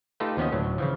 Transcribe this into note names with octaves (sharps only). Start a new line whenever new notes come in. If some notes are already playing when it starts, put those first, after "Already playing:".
A3 D#4 F4 G4 A4 B4
D#2 F3 B3 C#4 F#4 D#5
D2 A2 F#3
C#3 E3 F3